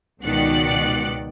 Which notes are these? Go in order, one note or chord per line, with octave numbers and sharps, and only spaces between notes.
C#2 B2 D#3 D5 F#6 C#7